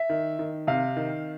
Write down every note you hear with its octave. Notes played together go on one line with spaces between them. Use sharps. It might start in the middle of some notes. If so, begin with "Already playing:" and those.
Already playing: E5
D#3
D#3
C3 F5
D#3